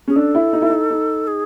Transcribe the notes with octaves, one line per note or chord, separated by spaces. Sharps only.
C#4 G#4
D4 A4
E4
D#4
E4
D#4
D#4
G#4